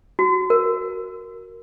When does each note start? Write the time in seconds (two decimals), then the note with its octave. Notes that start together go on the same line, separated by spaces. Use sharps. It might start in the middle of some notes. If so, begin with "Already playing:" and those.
0.19 F#4
0.50 A#4